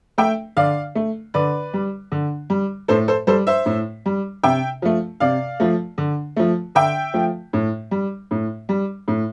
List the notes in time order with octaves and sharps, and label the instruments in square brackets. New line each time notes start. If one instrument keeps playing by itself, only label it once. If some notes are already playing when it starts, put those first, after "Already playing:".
[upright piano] A3 E5 G5
D3 D5 F5
A3
D3 B4 D5
G3
D3
G3
A2 A4 C5
A4 C5
G3 A4 C5
C5 E5
A2
G3
C3 E5 G5
F3 A3
C3 D5 F5
F3 A3
D3
F3 A3
D3 E5 G5
F3 A3
A2
G3
A2
G3
A2